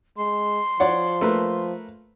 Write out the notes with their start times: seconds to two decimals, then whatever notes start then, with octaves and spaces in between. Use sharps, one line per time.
0.17 G#3 C6
0.80 F3 C#5 D5 F#5
1.21 A3 A#3 B4